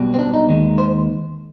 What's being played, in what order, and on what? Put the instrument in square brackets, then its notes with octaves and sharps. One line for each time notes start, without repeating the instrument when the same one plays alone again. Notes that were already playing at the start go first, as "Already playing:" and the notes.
Already playing: [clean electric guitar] B1 B2 G3
C4
D4
D#4
D#2 D#3 G#3
C5